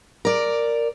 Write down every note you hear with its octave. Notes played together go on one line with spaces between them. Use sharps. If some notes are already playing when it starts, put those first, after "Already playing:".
A#4 D5